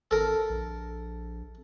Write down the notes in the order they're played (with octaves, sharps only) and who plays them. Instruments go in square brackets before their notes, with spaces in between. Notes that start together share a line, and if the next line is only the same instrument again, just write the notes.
[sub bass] G#1 [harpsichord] A4 A#4
[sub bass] A#1